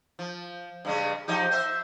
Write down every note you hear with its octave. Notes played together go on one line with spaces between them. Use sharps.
F3
G2 C#3 G#3
F3 D#4 G4
C5 E5